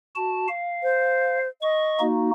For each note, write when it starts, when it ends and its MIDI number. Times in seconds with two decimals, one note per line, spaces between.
0.16 0.47 66
0.16 0.47 81
0.48 1.38 77
0.83 1.48 72
1.62 2.06 75
1.62 1.99 85
1.99 2.30 58
1.99 2.30 63
1.99 2.30 66